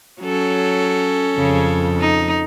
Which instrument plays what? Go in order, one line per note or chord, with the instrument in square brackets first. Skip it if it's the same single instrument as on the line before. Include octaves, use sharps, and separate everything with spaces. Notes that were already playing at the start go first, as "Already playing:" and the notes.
[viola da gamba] F#3 [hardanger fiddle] C#4 A4
[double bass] F2 [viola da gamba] C#3
[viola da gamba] D#4